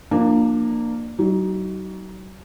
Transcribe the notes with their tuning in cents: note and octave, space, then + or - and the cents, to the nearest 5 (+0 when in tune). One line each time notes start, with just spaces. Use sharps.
F3 +0 A#3 +0 D4 +25
F#3 +35 D#4 +10